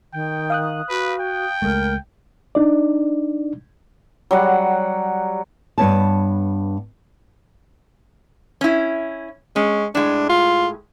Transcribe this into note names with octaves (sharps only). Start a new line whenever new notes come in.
D#3 G5
F5 D#6 F#6
F#4 B4
G5
C#2 G#3 A3 A#4
D4 D#4 D5
F#3 G3 F#5
G2 B3 C#5 A5
C#4 E4
G#3 C#4
A2 G#3 D4
F4